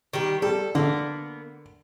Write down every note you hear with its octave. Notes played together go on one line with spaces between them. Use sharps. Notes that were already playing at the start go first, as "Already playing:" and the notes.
D#3 G3 G4
G3 A4
D3 A#3 B3